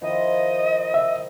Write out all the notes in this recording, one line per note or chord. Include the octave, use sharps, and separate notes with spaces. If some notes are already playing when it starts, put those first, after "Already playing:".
D#3 F3 E4 D#5
E5